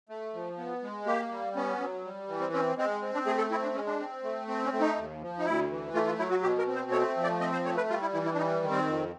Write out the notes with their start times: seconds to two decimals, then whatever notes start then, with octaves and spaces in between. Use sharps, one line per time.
0.09 A3
0.34 F3
0.58 B3
0.83 G#3
1.06 A#3 G4
1.31 G3
1.56 B3 C#4
1.80 F#3
2.05 G3
2.28 E3
2.40 C4
2.52 C4 C#4
2.77 G#3 C4
3.02 C4
3.14 D4
3.26 A3 G#4
3.38 A4
3.50 C4 E4
3.63 D4
3.75 G#3 C#4
3.87 D4
4.00 C4
4.23 A3
4.48 C4
4.65 C#4
4.73 A3
4.80 D#4
4.97 D#2
5.22 F3
5.39 D#4
5.45 D2 E4
5.70 E3
5.94 A3 F4
6.06 F4
6.18 F#3 E4
6.31 F#4
6.43 B2 G4
6.59 A#4
6.68 C4
6.75 C5
6.91 A3 C#5
7.17 F3
7.24 D5
7.40 C4 D#5
7.53 C5
7.65 A3 C#5
7.77 B4
7.89 G3 F4
8.02 E4
8.13 E3 E4
8.25 E4
8.33 D4
8.37 G3 D#4
8.62 D#3
8.70 C4
8.87 F2